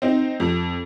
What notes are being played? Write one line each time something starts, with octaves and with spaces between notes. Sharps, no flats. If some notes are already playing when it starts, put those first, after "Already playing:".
C4 D#4
F2